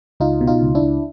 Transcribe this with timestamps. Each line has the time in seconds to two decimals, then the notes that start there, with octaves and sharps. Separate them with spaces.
0.20 C#2 D#4 F4
0.41 B2
0.47 D#4 F4
0.61 C#2
0.75 D4 E4
0.82 C#2